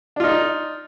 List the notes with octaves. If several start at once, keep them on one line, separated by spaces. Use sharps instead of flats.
D4 D#4 F4